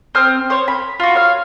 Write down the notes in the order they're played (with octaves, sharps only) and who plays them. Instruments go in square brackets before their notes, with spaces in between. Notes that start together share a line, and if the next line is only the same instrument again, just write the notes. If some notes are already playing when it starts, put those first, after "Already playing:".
[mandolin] C4 D#6 F6
C5 C#5
B5
F4 F#4
C#5 F5